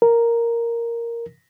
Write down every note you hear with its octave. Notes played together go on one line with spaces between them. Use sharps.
A#4